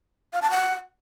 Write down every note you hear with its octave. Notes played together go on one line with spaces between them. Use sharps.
F5
A5
F#5